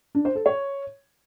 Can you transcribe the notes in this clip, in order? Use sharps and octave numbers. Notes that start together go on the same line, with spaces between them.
D4
C5
A4
C#5